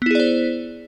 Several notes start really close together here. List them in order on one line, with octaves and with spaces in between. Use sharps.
B3 E4 G#4 D5 C5